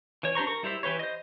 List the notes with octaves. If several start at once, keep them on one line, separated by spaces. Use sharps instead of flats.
E3 C#5
D4 G4 C5 A#5 C#6
A#4 C#6
G3 E4 G4 C5 E5
E3 G4 B4 C#5
C5 D#5